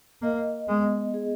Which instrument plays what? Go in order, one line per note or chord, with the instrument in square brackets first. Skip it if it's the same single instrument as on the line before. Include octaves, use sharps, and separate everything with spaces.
[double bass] A#3 [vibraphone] D#5
[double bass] G#3 [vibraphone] B3
[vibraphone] G#4